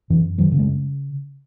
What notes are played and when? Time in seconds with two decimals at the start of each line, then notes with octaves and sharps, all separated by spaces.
0.10 F#2 E3
0.38 D#3 F#3
0.52 C#3
0.59 G#3